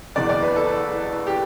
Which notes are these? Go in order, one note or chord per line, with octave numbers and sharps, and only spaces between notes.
F#1 E2 B2 D5
D5
B4
A4
G4